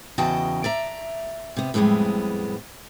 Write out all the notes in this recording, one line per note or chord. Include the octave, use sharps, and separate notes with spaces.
E2 C#3 F#4 D#5 G5 A5
D5 E5 A#5
C3 B3
F2 A2 G3 G#3 B3